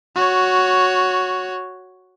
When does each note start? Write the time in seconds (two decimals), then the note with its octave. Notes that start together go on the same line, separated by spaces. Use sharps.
0.16 F#4 C#5